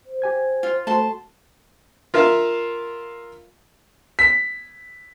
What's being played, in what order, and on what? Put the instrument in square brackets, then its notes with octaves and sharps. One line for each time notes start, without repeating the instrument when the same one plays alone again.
[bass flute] C5
[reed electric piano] G4 G#5 G#6
[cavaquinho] F4
[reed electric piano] A3 F#4 A4 [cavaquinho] A5 C6
[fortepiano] F4 A#4 E5 F5
[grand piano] B6